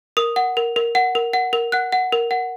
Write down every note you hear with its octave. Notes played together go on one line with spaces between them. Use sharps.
A#4 D#6
F#5
A#4
A#4
F#5
A#4
F#5
A#4
F#5 F#6
F#5
A#4
F#5